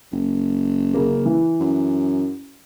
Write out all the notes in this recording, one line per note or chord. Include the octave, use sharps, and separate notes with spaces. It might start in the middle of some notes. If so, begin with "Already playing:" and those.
F#1
C#3 A#3
E3
F#2